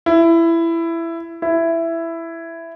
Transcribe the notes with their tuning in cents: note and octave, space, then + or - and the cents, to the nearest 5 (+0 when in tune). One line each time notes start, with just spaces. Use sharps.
E4 +15
E4 +10